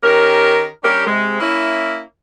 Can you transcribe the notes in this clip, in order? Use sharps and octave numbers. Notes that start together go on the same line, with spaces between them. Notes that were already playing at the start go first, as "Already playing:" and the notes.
D#3 C#4 G4 A#4
G3 C#4 D4 G4 A#4
C3 G#3
A#3 C#4 E4